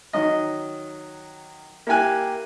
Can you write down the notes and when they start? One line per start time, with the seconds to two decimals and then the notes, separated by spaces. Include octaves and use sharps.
0.13 D#3 F#3 D#5
1.87 A#3 E4 G4 G#5 F#6